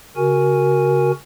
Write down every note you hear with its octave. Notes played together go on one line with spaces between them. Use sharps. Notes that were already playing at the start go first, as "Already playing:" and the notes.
C#3 F#4 A#4 G#5